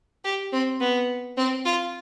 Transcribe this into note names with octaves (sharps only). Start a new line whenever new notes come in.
G4
C4
B3
C4
F4